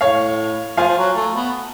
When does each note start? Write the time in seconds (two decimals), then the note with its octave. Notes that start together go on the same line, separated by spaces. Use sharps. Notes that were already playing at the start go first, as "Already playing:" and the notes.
0.01 A2 C#5 F5
0.77 F3 F5 G#5
0.88 F3
0.97 F#3
1.16 A3
1.36 B3